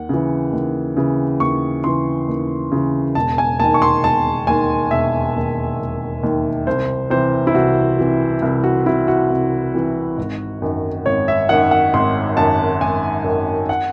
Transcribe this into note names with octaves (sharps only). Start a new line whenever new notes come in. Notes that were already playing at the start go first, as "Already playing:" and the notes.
Already playing: D#2 F#5
C#3 E3
D#2
C#3 E3
D#2 C#6
C#3 E3 C6
D#2
C#3 E3
E1 A5
G#5
D#2 D#3 A5
C#6
C6
E1 A5
D#2 D#3 G#5
E1 E5
D#2 D#3
E1
D#2 D#3
C2 C5
C3 E3 C5
E4
C2 F#4
C3 E3
C2
F#4
C3 E3 E4
F#4
C2
C3 E3
G#1
F#2 D#3
G#1 C#5
E5
F#2 D#3 F#5
F#5
G#1 C6
F#2 D#3 A5
G#1 G#5
F#2 D#3
F#5